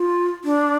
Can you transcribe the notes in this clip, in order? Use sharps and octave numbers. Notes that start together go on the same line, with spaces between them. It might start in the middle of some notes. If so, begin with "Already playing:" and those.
Already playing: F4
D4